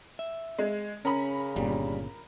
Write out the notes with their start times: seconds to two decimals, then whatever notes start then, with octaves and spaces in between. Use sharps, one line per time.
0.19 E5
0.59 G#3
1.05 C#3 C#4 A#4 B5
1.56 G1 A#2 G3